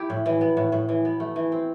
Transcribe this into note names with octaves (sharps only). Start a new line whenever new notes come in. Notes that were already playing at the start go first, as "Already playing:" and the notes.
Already playing: E4 G4
A2
E3
B3
A2
A2
E3
B3
A3
E3
C4